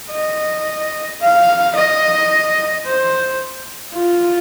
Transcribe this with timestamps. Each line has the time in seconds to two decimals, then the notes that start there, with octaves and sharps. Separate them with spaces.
0.11 D#5
1.21 F5
1.75 D#5
2.86 C5
3.94 F4